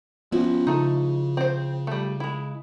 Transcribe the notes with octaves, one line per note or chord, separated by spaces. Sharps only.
F3 B3 C#4 E4 F#4
C#3 A3 D#4
C4 C5
G3 A3
G#3 E4